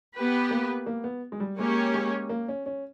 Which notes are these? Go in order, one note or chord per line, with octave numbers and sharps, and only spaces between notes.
B3 G4 B4
A#3
A#3
B3
G#3
G3
G#3 A#3 C#4 G4 C#5
G#3
A#3
C#4
C#4